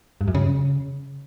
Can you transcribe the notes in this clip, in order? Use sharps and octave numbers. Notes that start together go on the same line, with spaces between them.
G2
F#2
C#3